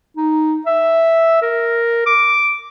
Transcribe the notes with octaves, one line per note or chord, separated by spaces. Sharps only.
D#4
E5
A#4
D6